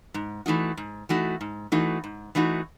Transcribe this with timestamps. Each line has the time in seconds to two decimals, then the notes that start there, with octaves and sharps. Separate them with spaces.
0.14 G#2
0.46 E3 A3 D#4 F#4
0.77 G#2
1.09 E3 A3 D#4 F#4
1.41 G#2
1.72 E3 A3 D#4 F#4
2.04 G#2
2.35 E3 A3 D#4 F#4